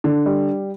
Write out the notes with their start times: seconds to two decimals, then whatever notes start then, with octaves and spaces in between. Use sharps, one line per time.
0.04 D3
0.26 G3